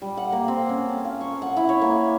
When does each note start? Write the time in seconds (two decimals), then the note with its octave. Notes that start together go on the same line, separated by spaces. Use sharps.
0.02 G3
0.17 F#5
0.32 A#3
0.48 C4
0.69 C#4
0.89 A5
1.05 F5
1.21 C#6
1.42 F#5
1.57 E4
1.69 C#5
1.81 A#3